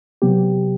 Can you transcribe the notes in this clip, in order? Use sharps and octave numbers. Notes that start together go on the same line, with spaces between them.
C3 F#3 B3 G4